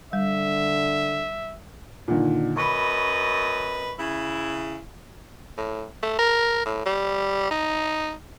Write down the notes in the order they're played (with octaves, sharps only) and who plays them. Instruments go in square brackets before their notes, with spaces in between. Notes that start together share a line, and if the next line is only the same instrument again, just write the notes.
[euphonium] D3 [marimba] G3 [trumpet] E5
[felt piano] A#2 D3 D#3
[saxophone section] F#2 B4 D#5 [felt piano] B5 C#6
[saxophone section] C#3 E4
[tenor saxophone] A2
A3
A#4
A2
G3
D#4